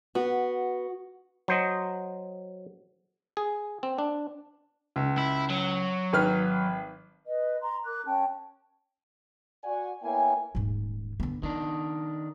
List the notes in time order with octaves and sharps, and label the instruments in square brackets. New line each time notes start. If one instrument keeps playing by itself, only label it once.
[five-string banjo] B3 [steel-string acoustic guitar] F#4
[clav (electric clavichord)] F#3 C5 D#5
G#4
C4
D4
[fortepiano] C#2
[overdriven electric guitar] E4
F#3
[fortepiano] G#1 B4 F6
[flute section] B4 D#5
A#5 C6
A#4 D6 F#6
C#4 G5 A5
[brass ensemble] F#4 D5 F#5 G#5
A#3 B3 E4 C#5 G5 G#5
[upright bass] D#1 G#2
D3 B3
[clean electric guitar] D#3 D4 [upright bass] B3